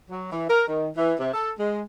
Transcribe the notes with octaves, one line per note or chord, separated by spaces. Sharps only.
F#3
E3
A#4
D#3
E3
C3
A4
G#3